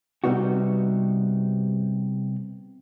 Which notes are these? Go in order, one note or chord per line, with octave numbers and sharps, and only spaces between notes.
C3 G3 B3 D#4 F#4